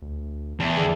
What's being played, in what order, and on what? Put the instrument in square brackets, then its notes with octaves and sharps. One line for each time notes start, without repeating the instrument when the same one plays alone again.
[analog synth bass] D2
[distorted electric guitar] E2 [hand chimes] E5 G5 A5
[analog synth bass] D3 [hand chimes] G#4 D5